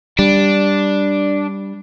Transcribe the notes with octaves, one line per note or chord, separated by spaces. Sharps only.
G3 D4